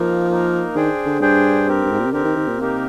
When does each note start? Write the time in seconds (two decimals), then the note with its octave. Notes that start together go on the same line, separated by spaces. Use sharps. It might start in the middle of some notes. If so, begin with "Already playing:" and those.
Already playing: F3 A#3 D#4 A#4
0.29 A#3 D#4 A#4
0.75 D#3 D4 G#4 C5 G5
1.06 D3
1.21 G2 D4 G#4 C5 G5
1.67 C4 G4 A#4
1.85 G2
1.92 G#2
1.99 A#2
2.06 C3
2.13 D3 C4 G4 A#4
2.24 D#3
2.36 D#3
2.48 A#2
2.59 C3 A#3 D#4 G4 A#4